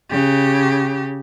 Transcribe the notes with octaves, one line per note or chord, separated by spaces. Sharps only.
C#3 G4